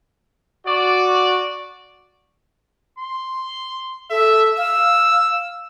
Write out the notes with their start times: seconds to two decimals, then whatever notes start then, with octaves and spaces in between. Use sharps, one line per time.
0.66 F#4 D5
2.99 C6
4.11 A4 E5
4.57 F5 E6